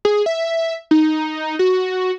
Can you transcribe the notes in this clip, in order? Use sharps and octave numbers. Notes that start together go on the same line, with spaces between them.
G#4
E5
D#4
F#4